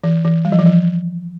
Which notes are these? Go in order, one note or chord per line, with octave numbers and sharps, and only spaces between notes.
E3
E3
G3
F3
E3
F3